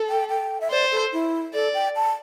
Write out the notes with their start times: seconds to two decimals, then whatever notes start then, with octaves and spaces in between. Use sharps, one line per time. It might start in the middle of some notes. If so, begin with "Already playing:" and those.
Already playing: A4
0.10 G5
0.29 G5
0.61 E5
0.71 C5 D5
0.91 A4
1.13 E4
1.54 A4 D5
1.74 G5
1.96 A5